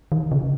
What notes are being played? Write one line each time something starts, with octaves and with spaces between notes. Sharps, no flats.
D#3
C#3